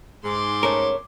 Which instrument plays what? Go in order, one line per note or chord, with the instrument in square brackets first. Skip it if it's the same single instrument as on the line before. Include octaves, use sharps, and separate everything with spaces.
[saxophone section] G#2 [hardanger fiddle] C6 D6
[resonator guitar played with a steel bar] A3 C#4 C#5 [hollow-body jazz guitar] A#4